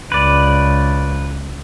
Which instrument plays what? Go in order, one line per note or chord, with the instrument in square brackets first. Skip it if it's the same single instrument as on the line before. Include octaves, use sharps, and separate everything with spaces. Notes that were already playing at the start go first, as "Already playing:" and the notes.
[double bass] C#2 [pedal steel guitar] B4 D5